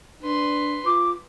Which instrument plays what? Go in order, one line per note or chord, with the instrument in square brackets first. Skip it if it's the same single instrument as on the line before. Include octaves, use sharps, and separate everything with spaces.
[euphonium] D4 [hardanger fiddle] B4 C6
[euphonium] F4 [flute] D6